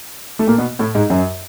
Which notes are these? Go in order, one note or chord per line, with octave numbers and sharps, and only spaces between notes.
A3
A#2 A#3
B2 B3
A2 A3
G#2 G#3
F#2 F#3